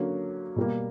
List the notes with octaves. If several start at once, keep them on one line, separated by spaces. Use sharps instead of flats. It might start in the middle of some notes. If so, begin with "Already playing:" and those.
Already playing: D3 F#3 A#3 C#4
B2 G3 A#3